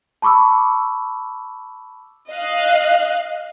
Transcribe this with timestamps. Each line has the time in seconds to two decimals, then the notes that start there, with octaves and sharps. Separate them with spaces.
0.22 A5 B5 C#6 D6 E6
2.30 D#5 F5 F#6